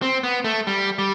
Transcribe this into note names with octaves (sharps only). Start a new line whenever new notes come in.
C4
B3
A3
G3
G3